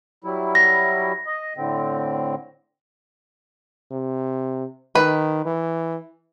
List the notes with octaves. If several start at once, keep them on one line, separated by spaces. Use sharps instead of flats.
F#3 G3 E4
A#6
D#5
A2 D3 C4
C3
D#3 B4
E3